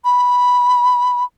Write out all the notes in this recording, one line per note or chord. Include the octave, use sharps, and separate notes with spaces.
B5